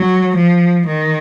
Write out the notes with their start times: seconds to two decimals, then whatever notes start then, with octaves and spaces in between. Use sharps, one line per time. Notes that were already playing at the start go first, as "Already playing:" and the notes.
Already playing: F#3
0.36 F3
0.86 D#3